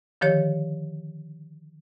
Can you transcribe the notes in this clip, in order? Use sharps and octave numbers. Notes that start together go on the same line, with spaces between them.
D3 D#3 F3 G4 C#5